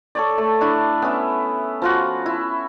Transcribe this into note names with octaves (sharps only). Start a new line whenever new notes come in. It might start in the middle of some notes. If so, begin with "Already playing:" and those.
A4 C#5 D5
A3
D4 E4
B3 C#4 E4 E5
F3 F4 F#4
E4